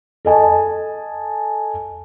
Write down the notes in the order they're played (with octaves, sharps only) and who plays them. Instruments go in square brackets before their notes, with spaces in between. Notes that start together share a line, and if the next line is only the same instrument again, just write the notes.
[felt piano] A4 D#5 G#5 A5